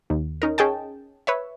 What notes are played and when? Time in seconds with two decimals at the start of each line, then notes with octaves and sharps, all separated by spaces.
0.10 D#2
0.42 C#4 D#4 A#4
0.58 C#4 G#4 D#5 G5 A5
1.27 B4 C#5 E5